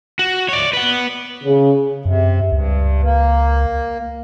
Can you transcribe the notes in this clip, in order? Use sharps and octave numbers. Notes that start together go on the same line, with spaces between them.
F#4
C#5 D5
B4 F#5
C#3
F#2 C3
C#2 G2
A#3